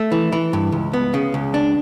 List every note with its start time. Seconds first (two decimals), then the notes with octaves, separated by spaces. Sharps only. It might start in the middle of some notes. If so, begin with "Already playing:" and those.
Already playing: A3
0.12 E3
0.32 E3
0.53 G2
0.72 C#2
0.93 B3
1.14 C#3
1.34 C#2
1.54 D4